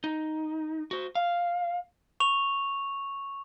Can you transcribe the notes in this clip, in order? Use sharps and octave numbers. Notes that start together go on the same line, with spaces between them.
D#4
F#4 C5
F5
C#6 F7